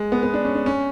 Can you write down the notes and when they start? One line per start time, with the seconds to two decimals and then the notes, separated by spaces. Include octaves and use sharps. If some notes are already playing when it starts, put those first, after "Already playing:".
Already playing: G#3
0.12 B3
0.23 B3
0.34 D4
0.45 C#4
0.55 D4
0.66 C#4